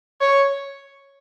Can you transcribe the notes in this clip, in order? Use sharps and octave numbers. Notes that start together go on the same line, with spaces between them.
C#5